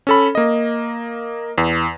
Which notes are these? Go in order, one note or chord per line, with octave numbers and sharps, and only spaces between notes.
C#4 A4 B5
A#3 D#5
E2